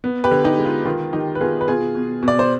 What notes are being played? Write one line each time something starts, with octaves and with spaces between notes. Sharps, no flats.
B3
G4 B4
D3
D#4 G4
G#3
F4
D#3 F4
D#3 D#4 G4
B4
B3 F4 G#4
B4
B2 F4 G#4
B2
B2
D5
C5